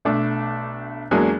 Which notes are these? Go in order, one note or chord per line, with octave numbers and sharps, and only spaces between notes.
B1 A3 D4 D6
E2 F#3 G#3 A#3 D4 G#5